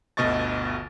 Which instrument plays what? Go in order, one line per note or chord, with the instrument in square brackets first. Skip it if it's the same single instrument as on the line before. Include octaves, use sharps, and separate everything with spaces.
[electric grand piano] G1 D2 B2 D#5 C#6 A6